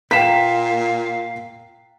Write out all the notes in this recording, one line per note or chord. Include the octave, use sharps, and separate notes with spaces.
A#2 F5 G5 A#5 B6 E7